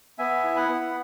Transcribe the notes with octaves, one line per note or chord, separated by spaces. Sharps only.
B3 E5 G#5
E4
F#5 B5
B3